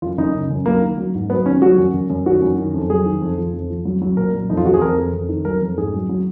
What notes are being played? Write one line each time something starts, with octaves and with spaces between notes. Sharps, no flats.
F#2 F4
F#2 D#4
C#3
F#2
F#3 A#3
D#3
F#3
G#2
F#3 B3
D#3 C#4
F#3 F#4
F#2
F#2
F#2
D#3 F#4
F#2
D#3
F2
F#3 G#4
D#3
F2
F3
F2
F3
F#3
F#3
A#2 A#4
F#3
F2 D#4
F4
F2 F#4
G#4
F2 A#4
F2
F2
D#3
F#3 A#4
F2
G#2 G#4
F#3
F#3